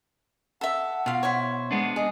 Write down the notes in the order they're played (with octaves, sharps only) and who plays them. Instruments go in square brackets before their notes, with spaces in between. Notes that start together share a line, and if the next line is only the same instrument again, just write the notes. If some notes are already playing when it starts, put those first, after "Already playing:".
[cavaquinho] A4 E5 [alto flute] F#5
[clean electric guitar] B2 [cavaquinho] F4 F5
[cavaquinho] E4 C5 C#5
[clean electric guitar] G#3 B3 D4 [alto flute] F#5
[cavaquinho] G#4 [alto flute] D#5